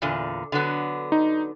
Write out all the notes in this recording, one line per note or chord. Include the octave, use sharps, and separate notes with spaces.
E2 A#2 D3
D3 F#3 B3
D#4